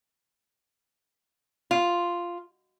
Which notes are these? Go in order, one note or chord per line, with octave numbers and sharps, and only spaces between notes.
F4